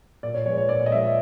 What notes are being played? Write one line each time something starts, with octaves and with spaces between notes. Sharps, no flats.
A#2 D5
C#5
F3 G#3 B3 C#5
C#5
A#2 D5
D#5
F3 G#3 B3 E5